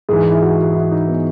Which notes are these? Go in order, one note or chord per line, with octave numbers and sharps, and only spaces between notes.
G#2 E3 G#4
E4
F#4
F#4
E4
D#4
B3